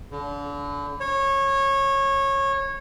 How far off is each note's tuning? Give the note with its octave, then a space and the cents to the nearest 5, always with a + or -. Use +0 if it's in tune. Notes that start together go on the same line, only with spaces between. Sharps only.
D3 -35
C#5 -20